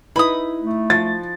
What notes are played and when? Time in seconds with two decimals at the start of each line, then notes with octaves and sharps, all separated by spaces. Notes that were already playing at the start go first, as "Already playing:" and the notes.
0.16 D#4 E4 B4 B5 D#6
0.61 A3
0.90 F3 A6